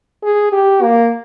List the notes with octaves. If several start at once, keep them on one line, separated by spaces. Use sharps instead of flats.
G#4
G4
A#3